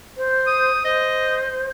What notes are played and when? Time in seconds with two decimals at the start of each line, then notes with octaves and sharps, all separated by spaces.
0.17 C5
0.46 D#6
0.85 C5 D#5